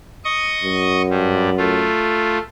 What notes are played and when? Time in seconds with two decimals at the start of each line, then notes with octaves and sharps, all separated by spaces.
0.24 D#5 C#6 D#6
0.64 F#2
1.10 G2 G3
1.58 A3 F4